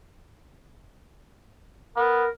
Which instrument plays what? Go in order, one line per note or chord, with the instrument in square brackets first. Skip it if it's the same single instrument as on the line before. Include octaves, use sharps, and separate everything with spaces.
[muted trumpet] B3 [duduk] A#4